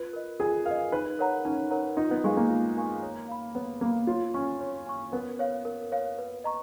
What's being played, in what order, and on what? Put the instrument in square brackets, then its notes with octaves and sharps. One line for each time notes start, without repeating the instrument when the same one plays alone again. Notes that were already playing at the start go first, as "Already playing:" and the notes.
Already playing: [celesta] F4 [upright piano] B4
[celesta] A#4 D#5
[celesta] F4 [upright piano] G#4
[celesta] A#4 [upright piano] F5
[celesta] D#5
[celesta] D#4 [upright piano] B4
[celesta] A#4 C#5 F#5 A#5
[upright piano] C#4 [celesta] D#4
[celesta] A#4 C#5 F#5 A#5
[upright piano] D#4 [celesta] F4
[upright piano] B3
[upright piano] G#3 [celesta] A#4 F5 G#5 C#6
[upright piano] A#3
[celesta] F4
A#4 F5 G#5 C#6
C#5
F5 B5
[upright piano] B3 [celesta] C#5
[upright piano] A#3 [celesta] F5 B5
[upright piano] F4 [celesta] C#5
[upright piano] C#4 [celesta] G#5 C#6
[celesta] C#5
G#5 C#6
[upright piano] B3 [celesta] A#4
[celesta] C#5 F5
A#4
C#5 F5
B4
D#5 A#5 C#6